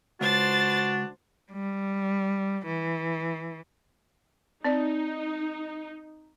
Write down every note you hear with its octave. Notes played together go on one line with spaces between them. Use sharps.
C#2 D4 F#4 C5 A6
G3
E3
C4 D#4 D5